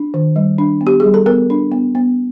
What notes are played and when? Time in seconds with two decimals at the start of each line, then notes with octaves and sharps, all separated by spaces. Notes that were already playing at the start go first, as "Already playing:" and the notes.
Already playing: D4
0.14 D#3
0.36 G3
0.58 D4
0.81 B3
0.87 G4
1.00 G3 G#4
1.14 A4
1.26 B3 A#4
1.50 D4
1.72 B3
1.95 B3